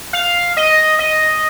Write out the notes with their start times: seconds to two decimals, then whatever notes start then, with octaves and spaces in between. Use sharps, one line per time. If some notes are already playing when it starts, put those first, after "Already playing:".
0.13 F5
0.57 D#5
0.99 D#5